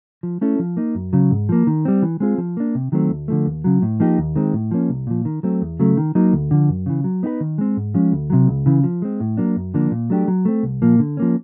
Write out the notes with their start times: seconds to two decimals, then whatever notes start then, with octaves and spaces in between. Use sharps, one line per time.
0.23 F3
0.41 A3 C#4 E4 A4
0.59 F3
0.77 A#3 D#4
0.95 F#2
1.13 C#3 F#3
1.31 G#2
1.49 F3 A#3
1.67 D#3
1.85 G3 C4
2.02 E3
2.20 G#3 C4 F4 G#4
2.38 F3
2.57 A#3 D4
2.75 C3
2.92 D#3 F#3 A3 C4
3.10 D2
3.28 D3 F3 A3
3.46 D#2
3.64 C#3 F#3
3.82 A2
4.00 F3 A#3 D#4 G4
4.18 D#2
4.36 D#3 G#3 C4
4.53 A2
4.71 F3 A#3 C#4
4.89 C2
5.07 A#2 F3
5.25 D#3
5.43 F#3 A3 C4
5.62 E2
5.79 C#3 F#3 A3
5.97 D#3
6.15 F#3 A#3 D#4
6.33 D2
6.51 D3 F3
6.69 F#2
6.86 C#3 E3
7.04 F#3
7.23 B3 D#4 F#4 B4
7.41 D#3
7.58 G#3 C4
7.77 G#2
7.94 F3 G#3 C#4
8.12 D2
8.30 C3 D#3 F#3
8.48 C#2
8.66 C#3 E3
8.84 F3
9.02 G#3 C4
9.20 A2
9.37 F#3 A#3 D4
9.56 F#2
9.74 D3 F3 A#3 D4
9.91 A#2
10.10 F#3 A3 D4 G4
10.28 F#3
10.45 A3 C4
10.63 C2
10.82 A#2 F3 A#3
10.99 D3
11.17 F3 A#3 C#4